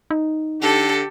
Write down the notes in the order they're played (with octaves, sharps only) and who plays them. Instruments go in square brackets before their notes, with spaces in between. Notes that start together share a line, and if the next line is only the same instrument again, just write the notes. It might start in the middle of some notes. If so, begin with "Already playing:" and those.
[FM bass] D#4
[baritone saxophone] D3 [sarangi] G4 [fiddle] A4